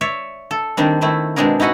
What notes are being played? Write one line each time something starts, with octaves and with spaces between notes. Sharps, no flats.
C#5 D5 E5
A4
D#3 G3 C4 D4
D#3 A3 C4 E4
B2 G#3 C4 D4 G#4 A#4
D#4 E4 F#4 D#5 F#5